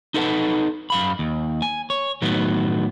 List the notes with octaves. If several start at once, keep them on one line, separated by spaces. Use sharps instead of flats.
D#4 E4 A4 B4 F#5 A5
F#2 F5 B5
D#2
G#5
C#5
A2 D#3 F#3 B3